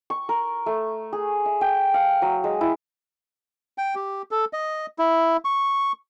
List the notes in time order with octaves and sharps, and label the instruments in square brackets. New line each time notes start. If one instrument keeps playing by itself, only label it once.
[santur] C#6
A#4
A3
G#4
E5
G5
F5
F#3
G#3
E4
[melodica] G5
G4
A4
D#5
E4
C#6